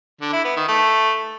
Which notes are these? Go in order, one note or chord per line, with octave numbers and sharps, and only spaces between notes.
D3
E4
B3
D#3
A3